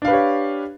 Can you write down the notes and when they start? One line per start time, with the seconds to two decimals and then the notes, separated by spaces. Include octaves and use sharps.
0.02 D4
0.05 F5
0.08 B4
0.10 G4
0.13 C#5